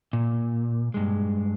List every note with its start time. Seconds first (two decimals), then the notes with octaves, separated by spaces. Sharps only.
0.13 A#2
0.94 G2 G#3